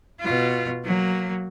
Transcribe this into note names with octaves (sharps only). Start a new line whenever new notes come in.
B2 F4
F#3 A#3